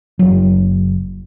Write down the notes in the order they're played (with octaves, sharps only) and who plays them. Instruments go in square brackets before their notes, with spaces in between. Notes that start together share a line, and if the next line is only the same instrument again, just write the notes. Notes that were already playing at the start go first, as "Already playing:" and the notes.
[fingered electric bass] F#1 F#3